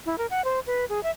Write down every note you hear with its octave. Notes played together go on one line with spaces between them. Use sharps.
E4
A#4
F#5
C5
B4
G#4
E5